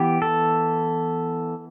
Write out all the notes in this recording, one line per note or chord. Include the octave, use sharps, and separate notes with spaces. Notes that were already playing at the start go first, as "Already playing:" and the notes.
Already playing: E3 B3 G4
A4